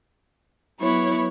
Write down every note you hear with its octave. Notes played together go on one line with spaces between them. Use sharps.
F#3 B3 E4 C#5